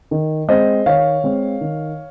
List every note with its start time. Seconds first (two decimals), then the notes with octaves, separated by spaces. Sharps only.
0.11 D#3
0.48 G#3 C4 C5 D#5
0.86 D#3 C#5 F5
1.24 G#3 C4
1.61 D#3